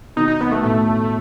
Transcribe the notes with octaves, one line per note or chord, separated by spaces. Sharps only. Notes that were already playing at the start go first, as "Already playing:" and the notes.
B2 D#3 D#4
D#4
B2 B3
A3
A2 A3